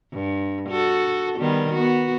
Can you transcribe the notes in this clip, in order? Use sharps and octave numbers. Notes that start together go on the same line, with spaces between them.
G2
F#4 A4
D#3 G3 B3
B3 F#4